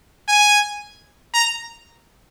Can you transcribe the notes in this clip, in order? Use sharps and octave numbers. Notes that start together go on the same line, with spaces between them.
G#5
A#5